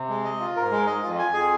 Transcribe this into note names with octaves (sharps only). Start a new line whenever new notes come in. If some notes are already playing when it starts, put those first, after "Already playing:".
Already playing: C3
G#3
D#5
F4
G#2 A#4
G#3
G#2
D#5
F2 F4
G#5
F2
G#4